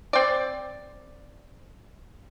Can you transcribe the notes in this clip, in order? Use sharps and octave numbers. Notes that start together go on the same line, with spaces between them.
C4 D5